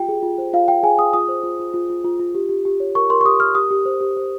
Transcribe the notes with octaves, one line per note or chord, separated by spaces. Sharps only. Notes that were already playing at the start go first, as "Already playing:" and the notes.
Already playing: F4 G4 G5
G#4
F4
C5
F4 F5
F4 G5
G#4 G#5
G#4 D#6
F4 D#6
C5
F4
F4
F4
F4
F4
F4
G4
G4
G4
C#5
A#4 C#6
A#4 C6
C#6
G4 D#6
A#4 F6
G4 D#6
G4
C5
G4
C5